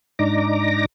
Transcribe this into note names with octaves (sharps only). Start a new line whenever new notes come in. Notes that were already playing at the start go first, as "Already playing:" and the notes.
G#2 D4 D#4 A#5 D6 A#6